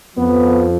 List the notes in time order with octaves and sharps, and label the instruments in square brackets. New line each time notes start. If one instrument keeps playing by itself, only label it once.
[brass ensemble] F2 F3 B3